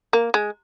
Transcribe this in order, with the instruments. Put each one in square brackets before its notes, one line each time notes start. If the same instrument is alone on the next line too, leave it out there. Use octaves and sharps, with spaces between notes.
[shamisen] A#3
G#3